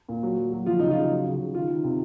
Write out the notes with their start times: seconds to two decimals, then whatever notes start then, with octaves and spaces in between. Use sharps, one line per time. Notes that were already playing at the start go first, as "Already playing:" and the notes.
0.09 A#2
0.23 F#3
0.38 F#3
0.53 F#3
0.66 F3 F4
0.79 C#3 D#4
0.91 F4
0.96 C#3
1.10 F#3
1.25 C#3
1.40 C#3
1.54 D#3 F4
1.70 D#3
1.84 C3